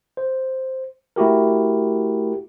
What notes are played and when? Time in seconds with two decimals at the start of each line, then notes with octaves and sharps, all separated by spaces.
0.17 C5
1.16 A3 E4 F#4 G4 A#4